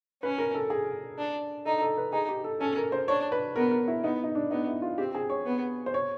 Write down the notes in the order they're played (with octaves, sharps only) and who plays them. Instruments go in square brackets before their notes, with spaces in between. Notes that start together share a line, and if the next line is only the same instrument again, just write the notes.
[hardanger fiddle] C#4 [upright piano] B4
[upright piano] A#4
A4
G#4
[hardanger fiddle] D4
[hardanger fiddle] D#4 [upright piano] A4
[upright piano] A4
B4
[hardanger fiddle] D#4 [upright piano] G#4
[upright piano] G4
A4
[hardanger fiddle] C#4 [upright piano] A4
[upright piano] A#4
C5
[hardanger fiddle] D4 [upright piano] C#5
[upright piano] B4
[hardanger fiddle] B3 [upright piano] A#4
[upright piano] A#4
E4
[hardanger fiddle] B3 [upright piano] D#4
[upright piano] D#4
D4
[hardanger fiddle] B3 [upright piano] D#4
[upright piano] E4
F4
[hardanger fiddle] C4 [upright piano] G4
[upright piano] G#4
C#5
[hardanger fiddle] B3
[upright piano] C5
C#5